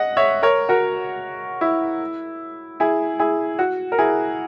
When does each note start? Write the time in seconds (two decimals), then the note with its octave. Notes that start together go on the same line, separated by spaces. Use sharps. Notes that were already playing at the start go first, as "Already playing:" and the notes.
Already playing: D#5 F#5
0.17 C#5 E5
0.43 A#4 C#5
0.69 F#4 A#4
1.61 E4
2.80 E4 G#4
3.20 E4 G#4
3.59 F#4
3.92 A#4
3.98 E4 G#4